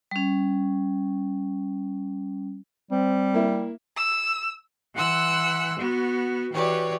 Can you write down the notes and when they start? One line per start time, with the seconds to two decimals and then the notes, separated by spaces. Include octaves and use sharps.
0.11 G3 C#4
2.91 G3 C4
3.34 A#3 E4
3.97 E6
4.95 E3 F#5 C6 E6 F#6
5.78 B3 F#4
6.53 E3 F#4 G4 B4 C#5 D5